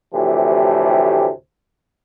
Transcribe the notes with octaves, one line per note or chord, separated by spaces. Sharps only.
D2 A2 C3 E3 F3 G4